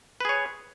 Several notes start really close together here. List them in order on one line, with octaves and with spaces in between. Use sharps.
B4 G#4 C#5